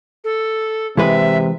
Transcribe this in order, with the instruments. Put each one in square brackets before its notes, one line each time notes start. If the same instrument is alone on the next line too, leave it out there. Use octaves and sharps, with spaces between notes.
[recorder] A4
[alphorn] C3 [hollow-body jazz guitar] E3 G#3 B4 [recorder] E5